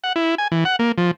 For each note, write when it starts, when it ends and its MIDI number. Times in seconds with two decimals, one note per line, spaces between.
0.04 0.13 78
0.16 0.35 64
0.38 0.48 80
0.52 0.64 52
0.65 0.76 78
0.79 0.92 58
0.98 1.11 53